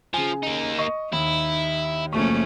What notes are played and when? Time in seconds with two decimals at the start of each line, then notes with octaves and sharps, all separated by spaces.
0.14 C#3 F3 G#5
0.43 A#3 D#4
0.78 D#5 C#6
1.12 D#2 D#4 E4
2.13 F#1 F3 A3 A#3 C#4 C#6